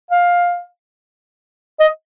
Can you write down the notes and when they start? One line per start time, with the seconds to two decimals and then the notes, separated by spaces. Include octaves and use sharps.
0.11 F5
1.80 D#5